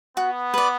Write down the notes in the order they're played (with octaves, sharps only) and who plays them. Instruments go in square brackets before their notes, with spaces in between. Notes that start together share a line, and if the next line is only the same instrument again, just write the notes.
[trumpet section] B3 [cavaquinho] F#4
[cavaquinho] B4 D5